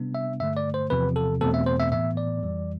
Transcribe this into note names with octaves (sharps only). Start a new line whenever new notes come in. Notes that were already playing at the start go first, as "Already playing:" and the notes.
Already playing: C3 G3 B3 D4
E5
G2 D3 A3 E5
D5
C5
E2 C3 F3 B4
A4
E2 B2 A3 C4 A4
E5
C5
E5
A2 E3 B3 E5
D5
F2 E3 G3